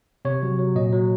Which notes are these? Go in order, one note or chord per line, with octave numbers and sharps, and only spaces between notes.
C3 C#5
F#3
F#3
A#2 D#5
F#3